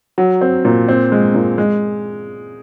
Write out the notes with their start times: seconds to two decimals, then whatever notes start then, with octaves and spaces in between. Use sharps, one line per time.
0.18 F#3
0.41 C4
0.65 A#2
0.89 C4
1.12 G#3
1.34 A#2
1.58 G#3